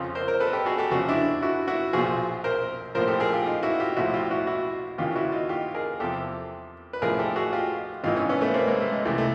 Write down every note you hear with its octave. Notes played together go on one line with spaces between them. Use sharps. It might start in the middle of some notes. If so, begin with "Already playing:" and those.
Already playing: F2 C#3 F3
A#4 C5
A#4 C5
A4 B4
G4 A4
F#4 G#4
G4 A4
E2 C#3 F3 F#4 G#4
D4 E4
E4 F#4
E4 F#4
B1 A#2 F3 F#4 G#4
A#4 C5
A#1 A2 F3 A#4 C5
G4 A4
G#4 A#4
F4 G4
D#4 F4
E4 F#4
F4 G4
B1 A2 F3 E4 F#4
F4 G4
E4 F#4
E4 F#4
D#2 C#3 E3 F4 G4
E4 F#4
D#4 F4
F4 G4
G#4 A#4
E2 C3 F3 G4 A4
B4
A1 A2 F3 G#4 A#4
G4 A4
F#4 G#4
F4 G4
G#1 G#2 E3 D#4 F4
C#4 D#4
B3 C#4
A3 B3
A#3 C4
G#3 A#3
A3
G#3
C2 C3 E3 A3
A3